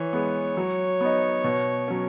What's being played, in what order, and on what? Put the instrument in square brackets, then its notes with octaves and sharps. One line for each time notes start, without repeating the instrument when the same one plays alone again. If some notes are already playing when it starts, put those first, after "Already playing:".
Already playing: [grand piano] E3 [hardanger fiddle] C#5
[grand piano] G#3 B3
F#3
B3 D#4
B2
F#3 C#4